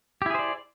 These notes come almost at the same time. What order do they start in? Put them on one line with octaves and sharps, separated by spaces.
G4 E4 G#4 C5 D5